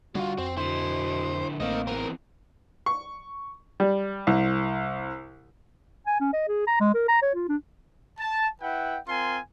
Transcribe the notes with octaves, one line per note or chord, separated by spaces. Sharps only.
D3 G3 F4 F#4
F2 C4
B2 D3 E4 C5
A1 A3 A#3 C4 A#4 D#5
E3 B3 C4 A#4
C#6
G3
C2
G#5
C#4
D#5
G#4
A#5
G#3
A#4
A#5
C#5
F4
D4
A5
E4 B4 F#5 G5
C4 F4 A#4 G#5 C6